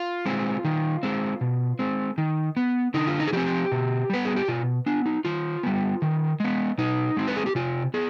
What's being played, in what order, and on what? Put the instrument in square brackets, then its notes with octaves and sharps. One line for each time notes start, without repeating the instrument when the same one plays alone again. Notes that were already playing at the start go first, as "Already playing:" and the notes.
Already playing: [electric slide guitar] F4
G#3 C4
D#3
G#3 C4
B2
G#3 C4
D#3
B3
D3 D#4
F4
D#4
G#4
F3 C4 G4
B2
G3 B3 B4
G#4
G4
B2 F4
B3 D4
D#4
D#3 F4
G3 B3
D#3
G#3 B3
B2 D#4
G#3 C4
B4
G#4
G4
C3 F4
B3 G#4